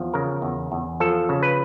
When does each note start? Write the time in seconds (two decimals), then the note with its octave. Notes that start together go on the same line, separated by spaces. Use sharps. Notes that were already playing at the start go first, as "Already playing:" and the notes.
Already playing: E2 F3
0.14 C#3 A#4
0.42 E2
0.72 E2
1.00 F3 A4
1.29 C#3
1.43 B4